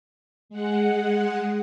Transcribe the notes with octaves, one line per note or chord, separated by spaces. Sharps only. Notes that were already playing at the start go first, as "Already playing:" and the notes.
G#3 F#5